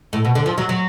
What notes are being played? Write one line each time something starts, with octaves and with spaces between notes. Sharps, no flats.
A2
B2
D3
F3
F#3
F#3